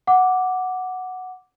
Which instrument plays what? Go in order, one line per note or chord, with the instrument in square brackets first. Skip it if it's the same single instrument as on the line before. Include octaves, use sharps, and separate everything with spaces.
[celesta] F#5 D6